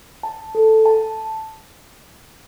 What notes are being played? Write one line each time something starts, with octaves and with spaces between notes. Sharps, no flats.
A5
A4
A5